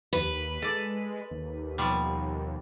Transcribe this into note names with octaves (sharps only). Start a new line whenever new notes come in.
D#2 B4
G#3 A4 D5
D#2
B2 F3 G3